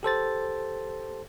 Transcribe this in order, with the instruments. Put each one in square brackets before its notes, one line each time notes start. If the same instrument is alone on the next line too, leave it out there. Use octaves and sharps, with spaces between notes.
[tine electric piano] G4 A4 C5 A6